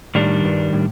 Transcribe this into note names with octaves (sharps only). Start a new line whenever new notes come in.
A2 D#3 G3 D4
G2
A2